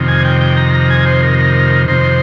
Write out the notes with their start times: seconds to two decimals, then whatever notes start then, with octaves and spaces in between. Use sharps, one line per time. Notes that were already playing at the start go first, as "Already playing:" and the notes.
Already playing: F2 C3 D#3
0.08 G#5
0.25 G5
0.41 G5
0.57 A#5
0.74 A#5
0.90 G#5
1.06 C5
1.23 A#4
1.39 A#4
1.88 F2 C3 D#3 C5